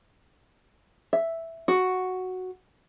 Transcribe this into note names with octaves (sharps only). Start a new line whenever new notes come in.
E5
F#4